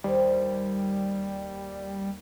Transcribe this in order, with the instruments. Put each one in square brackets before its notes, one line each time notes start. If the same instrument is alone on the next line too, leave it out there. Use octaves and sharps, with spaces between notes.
[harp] D#2 C5 [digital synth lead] G3